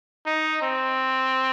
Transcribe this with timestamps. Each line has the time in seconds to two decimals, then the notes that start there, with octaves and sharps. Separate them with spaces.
0.26 D#4
0.62 C4